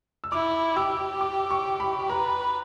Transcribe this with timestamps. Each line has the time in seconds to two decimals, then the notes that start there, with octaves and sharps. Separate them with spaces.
0.24 E6
0.32 E4 D6
0.77 G4 E6
1.21 D6
1.51 C#6
1.80 B5
2.10 B4 A#5